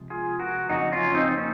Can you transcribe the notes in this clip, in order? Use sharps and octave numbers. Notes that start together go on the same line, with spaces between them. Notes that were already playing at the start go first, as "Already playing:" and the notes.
Already playing: C3 F3 G#3
F4 G#4
F#4 A#4
F2 C#3 F#3 A#3 D#4 F#4
C#4 F4
C4 D#4
A#3 C#4